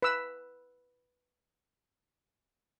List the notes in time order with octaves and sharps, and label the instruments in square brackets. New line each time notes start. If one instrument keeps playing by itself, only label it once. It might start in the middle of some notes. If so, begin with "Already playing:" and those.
[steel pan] B4 E6